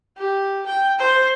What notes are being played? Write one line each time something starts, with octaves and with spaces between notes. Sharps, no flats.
G4
G5
C5